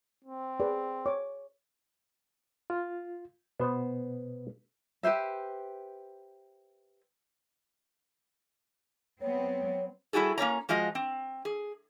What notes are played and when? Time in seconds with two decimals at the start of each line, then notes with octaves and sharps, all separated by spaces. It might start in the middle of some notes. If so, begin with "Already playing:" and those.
0.25 C4
0.60 G#4 B4 D5
1.06 C#5 D6
2.70 F4
3.60 B2 B3 C5
5.03 G4 B4 C5 E5
9.21 F#3 B3 C4 C#5
10.13 G3 E4 F#4 G#4 A4
10.38 A#3 C#4 C#5 A#5
10.69 F3 G#3 F4 F#4 D#5
10.95 C4
11.45 G#4